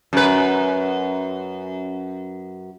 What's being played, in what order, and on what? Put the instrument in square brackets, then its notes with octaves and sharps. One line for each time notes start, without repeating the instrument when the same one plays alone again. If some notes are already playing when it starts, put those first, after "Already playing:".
[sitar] F#2 B4